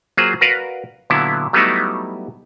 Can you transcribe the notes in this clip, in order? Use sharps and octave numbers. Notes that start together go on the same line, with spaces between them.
F#3 A#3 F4 G#4 C5
F#4 A#4 B4 D5 F5
A#2 D3 F#3 B3 E4
F#3 G3 A3 B3 D#4 E4